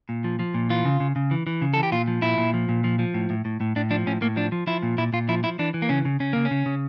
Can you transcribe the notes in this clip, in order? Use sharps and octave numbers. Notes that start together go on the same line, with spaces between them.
A#2
F3
F3
A#2
E3 F4
C#3
C#3
C#3
E3
E3
C#3
E3 A4
G4
A#2 F4
F3
A#2 E4
A#2
F3
A#2
F3
F3
A2
A2
A2
A2
A2 D4
F3 D4
A2 C#4
A2 A#3
F3 D4
F3
F3 E4
A#2
A#2 E4
A#2 F4
F3 E4
F3 E4
E3 D4
E3
A#3
C#3 C#4
C#3
C#3 C#4
C#3 A#3
C#4
C#3
C#3